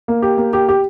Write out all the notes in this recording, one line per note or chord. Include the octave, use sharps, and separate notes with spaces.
A#3
G4
A#3
G4
G4